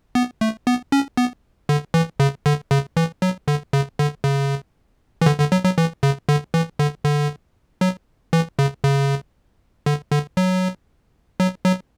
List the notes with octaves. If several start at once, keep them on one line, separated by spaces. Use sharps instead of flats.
B3
A3
B3
C#4
B3
D3
E3
C#3
D3
C#3
E3
F#3
D3
C#3
D3
C#3
E3
D3
D3
F#3
F#3
E3
C#3
D3
E3
D3
D3
F#3
E3
C#3
C#3
D3
D3
F#3
F#3
F#3